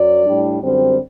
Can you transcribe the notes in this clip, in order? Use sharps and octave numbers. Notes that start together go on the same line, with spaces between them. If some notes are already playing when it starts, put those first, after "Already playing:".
Already playing: F#2 F#3 D5
A2 G3 D4
F#2 D3 G3 C4 C5